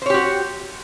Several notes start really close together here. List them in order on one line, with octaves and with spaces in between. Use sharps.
C5 C#5 G4 F#4